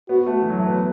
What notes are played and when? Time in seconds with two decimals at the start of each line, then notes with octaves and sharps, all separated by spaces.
0.09 B3 F#4
0.26 A3
0.42 E3
0.50 F#3
0.59 A3
0.67 B3